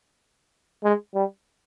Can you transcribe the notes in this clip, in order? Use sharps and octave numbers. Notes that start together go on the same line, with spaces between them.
G#3
G3